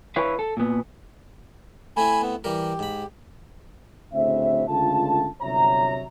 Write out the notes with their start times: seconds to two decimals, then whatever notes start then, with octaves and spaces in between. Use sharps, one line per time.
0.16 E4 B4 C#5 E5 F5
0.39 A4
0.57 A#2 B3
1.97 A3 C4 E4 G#5 B5
2.22 B3
2.44 E3 G3 G4 A#4
2.79 G#2 B5
4.13 D2 A2 C#3 C4 E5
4.68 C#2 D3 A3 F4 A4 A5
5.42 G1 C3 F#3 C#5 E5 A#5